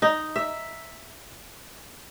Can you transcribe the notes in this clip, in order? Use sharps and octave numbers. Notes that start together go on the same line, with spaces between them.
D#4
E5